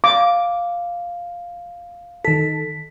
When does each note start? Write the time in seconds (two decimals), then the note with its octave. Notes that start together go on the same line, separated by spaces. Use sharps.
0.04 F5 D6
2.25 D#3 A4 B6